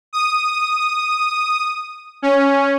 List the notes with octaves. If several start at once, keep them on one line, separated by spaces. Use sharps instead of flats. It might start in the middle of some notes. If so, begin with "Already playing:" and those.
D#6
C#4